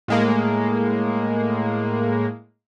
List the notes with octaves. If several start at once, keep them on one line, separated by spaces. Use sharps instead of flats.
A2 G#3 A#3